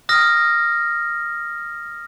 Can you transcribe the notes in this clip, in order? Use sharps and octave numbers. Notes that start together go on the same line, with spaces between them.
D#6 F6 A#6